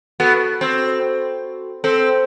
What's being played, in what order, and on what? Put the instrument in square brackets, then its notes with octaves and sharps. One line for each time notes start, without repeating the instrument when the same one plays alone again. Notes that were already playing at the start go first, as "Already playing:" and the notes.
[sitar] B3 [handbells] F#4 A4
[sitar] C4
[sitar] C4 [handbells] A4 C5